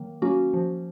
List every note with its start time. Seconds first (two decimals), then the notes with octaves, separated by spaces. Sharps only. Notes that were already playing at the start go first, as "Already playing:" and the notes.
Already playing: D#3 F#3 A#3
0.22 F#3 A#3 C#4 F#4
0.54 F3